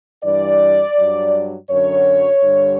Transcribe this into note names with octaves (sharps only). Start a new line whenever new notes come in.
G2 E3 G3 D5
G2 F#3
F#2 D3 F#3 C#5
G2 D3 G3